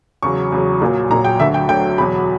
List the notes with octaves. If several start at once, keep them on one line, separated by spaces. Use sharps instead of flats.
E2 C#3 F#3 C#6
E2 C#3 F#3
A#1 A#2 F#3
A#1 A#2 F#3 A#5
G5
D2 D3 F#3 E5
G5
D2 D3 F#3 G5
E2 B2 F#3 B5